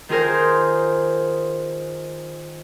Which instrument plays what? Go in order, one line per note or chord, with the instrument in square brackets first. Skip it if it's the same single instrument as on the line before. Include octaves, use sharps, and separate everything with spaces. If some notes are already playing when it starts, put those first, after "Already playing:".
[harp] D#3 F4 G#4 A#4 C5